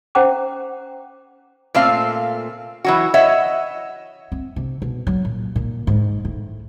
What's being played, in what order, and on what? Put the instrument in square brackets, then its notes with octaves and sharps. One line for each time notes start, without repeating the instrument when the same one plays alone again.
[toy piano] C#4 C5 F#5 G5 A#5 D6
[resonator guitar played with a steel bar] A#2 A3 C4 F5
E3 F#3 F#4
C#5 D#5 E5 F#5
[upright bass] C4
C3
B2
F#3
A#2
A#2
G#2
A2